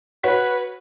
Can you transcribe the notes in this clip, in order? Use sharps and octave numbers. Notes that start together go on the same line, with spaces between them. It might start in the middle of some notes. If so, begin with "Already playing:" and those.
F#4 B4 C#5 B6